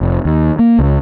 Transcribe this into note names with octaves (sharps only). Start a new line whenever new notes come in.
F1
D#2
A#3
C#2